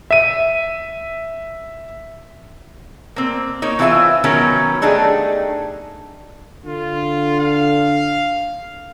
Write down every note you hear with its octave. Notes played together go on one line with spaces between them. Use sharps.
E5 D#7
A#3 C4
A#3 D#4 C#5
E3 C4 F4 G#4 E5 G#5
B2 D#3 F#3 B3 C#4 A#4
A3 D4 D#4 G4 G#4
D3 F4
F5